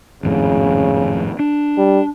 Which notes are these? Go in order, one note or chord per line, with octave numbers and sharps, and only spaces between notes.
G#1 F2 A2 C#3
D4
G3